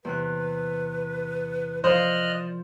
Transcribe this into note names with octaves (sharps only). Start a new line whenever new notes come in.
E2 C3 B4 F#6
F3 A#4 C5 D5 D#5 F5 F6 F#6